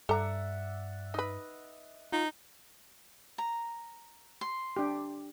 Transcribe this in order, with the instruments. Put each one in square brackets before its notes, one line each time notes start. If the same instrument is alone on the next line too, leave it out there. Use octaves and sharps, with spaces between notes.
[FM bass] G2 [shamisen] A4 A#5 [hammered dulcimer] D5 E5 F#5
[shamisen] D#4 B4 [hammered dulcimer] D#5
[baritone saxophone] D#4 [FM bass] F4
[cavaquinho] A#5
C6
[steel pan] D4 G4